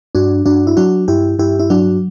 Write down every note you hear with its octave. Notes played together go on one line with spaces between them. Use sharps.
G2 D4 F#4
G2 D4 F#4
E4
F#3 D4 F#4
G2 E4 G4
G2 E4 G4
E4
F#3 D4 F#4